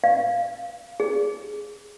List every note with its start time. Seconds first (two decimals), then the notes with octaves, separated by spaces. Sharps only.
0.04 F5
1.00 G#4